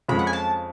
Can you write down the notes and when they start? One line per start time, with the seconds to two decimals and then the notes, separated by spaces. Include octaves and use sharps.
0.08 F2 C#3 F3 G#3 B5
0.19 F#5
0.27 G#5
0.33 A5